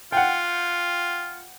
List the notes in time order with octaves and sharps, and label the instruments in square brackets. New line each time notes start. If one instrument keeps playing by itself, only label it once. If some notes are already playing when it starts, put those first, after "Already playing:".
[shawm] F4 [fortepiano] F#5 G5